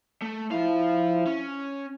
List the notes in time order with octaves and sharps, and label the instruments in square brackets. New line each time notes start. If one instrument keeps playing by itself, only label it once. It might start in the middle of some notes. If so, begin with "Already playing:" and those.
[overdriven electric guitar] A3
[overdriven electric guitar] F3 F5 [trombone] E4
[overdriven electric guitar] C#4